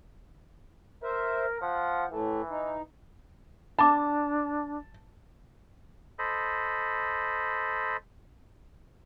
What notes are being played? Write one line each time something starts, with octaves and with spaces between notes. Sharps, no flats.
A#4 C5 E5
F3 F#5
A2 E3 A3
D#4
D4 A5 B5 D6
A4 C5 D#5 B5